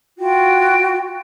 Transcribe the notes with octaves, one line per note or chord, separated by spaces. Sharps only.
F4 F#4 G5